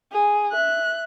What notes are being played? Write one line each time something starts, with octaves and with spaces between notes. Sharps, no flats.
G#4
E5 F#6